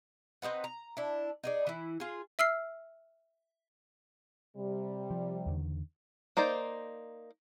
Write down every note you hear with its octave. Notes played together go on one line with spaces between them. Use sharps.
C4 D#4 B4 F#5
A#5
D4 E4
D#4 G#4 D5
E3 E4
F4 G#4
E5 E6 F6 C7
C3 G3
F3
E2 D3 D#3
A#3 D#4 C5 D5